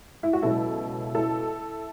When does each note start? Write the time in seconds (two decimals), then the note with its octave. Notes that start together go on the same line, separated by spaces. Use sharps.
0.23 E4
0.33 F#4
0.42 C#2 B2 F#3 E4 A4
1.15 E4 A4